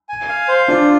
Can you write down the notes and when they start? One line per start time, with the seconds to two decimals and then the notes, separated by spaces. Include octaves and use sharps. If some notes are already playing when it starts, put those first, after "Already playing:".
0.09 G#5
0.29 F5
0.48 C5
0.68 D4 F4